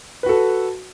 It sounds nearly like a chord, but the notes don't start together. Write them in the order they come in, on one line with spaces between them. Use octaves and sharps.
B4 F#4 A4